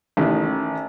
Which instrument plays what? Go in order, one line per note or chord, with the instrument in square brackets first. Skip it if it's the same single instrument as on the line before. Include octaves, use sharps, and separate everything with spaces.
[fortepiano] A1 D#3